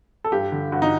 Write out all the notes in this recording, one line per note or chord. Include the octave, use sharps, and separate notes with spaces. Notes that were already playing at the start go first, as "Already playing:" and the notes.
A4
G2 G4
D3
G2 F#4
D#4